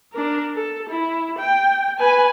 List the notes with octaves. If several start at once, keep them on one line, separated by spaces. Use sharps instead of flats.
D4 A#4
A4
E4
G5
B4 G#5